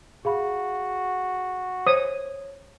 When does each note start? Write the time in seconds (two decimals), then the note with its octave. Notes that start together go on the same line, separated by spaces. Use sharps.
0.25 F#4 G#4 F5 B5
1.87 C5 C#5 D#6 G#6